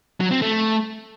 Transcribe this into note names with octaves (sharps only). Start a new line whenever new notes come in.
F#3
C4
A3